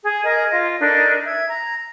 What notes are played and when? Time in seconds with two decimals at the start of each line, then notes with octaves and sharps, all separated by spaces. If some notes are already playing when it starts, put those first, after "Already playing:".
0.03 G#4
0.24 G#4 A#4 D#5
0.52 F4 D#5
0.80 D4 D#4 A4 A#4
1.24 E5 G#6
1.49 A#5